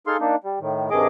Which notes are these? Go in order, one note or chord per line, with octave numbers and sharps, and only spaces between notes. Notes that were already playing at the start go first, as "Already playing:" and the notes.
D#4 G#4 A4 F5 C6
A#3 D4 D#4
G3
A2 D#3
G2 C3 D#3 G#4 D#5 D6